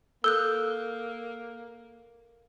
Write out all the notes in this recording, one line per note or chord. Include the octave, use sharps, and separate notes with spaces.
A#3 A4 E6 F#6 G6 G7